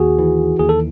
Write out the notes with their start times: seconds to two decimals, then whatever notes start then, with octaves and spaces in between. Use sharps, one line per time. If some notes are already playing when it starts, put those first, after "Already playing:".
Already playing: D#2 F#4 G#4
0.19 E3
0.59 D#2 G#4
0.69 A4